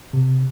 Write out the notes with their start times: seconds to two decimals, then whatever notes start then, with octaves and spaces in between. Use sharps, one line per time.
0.13 C3